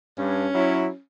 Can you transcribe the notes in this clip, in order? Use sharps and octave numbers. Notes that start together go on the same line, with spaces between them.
G2 C#4
F#3 E4